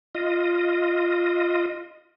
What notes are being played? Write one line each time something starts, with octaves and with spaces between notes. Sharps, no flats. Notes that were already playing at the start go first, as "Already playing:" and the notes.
F4 D#5